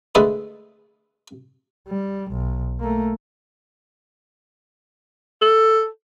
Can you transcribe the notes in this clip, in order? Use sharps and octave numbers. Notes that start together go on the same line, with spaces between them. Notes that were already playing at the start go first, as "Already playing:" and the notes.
D3 G#3 A3 G#4 A4 B4
G3
B1
A3 A#3
A4